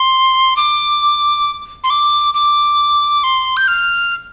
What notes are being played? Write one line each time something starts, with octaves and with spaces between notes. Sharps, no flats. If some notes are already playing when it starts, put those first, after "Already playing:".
Already playing: C6
D6
C6
D6
D6
C6
G6
F6